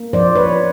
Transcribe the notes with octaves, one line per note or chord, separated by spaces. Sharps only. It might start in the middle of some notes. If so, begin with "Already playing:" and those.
Already playing: A#3
F3 C5 D5
B4 C#5